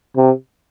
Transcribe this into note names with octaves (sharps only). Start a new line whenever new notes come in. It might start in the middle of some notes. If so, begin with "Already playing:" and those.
C3